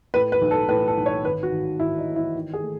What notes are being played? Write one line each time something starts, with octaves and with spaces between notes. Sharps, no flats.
A2 B4
B4
B1
A4
A2 B4
A4
B1
C#5
G#1 B4
F#4
G#1
G#1 E4
D#4
E3
E4
D#3
G#4
A3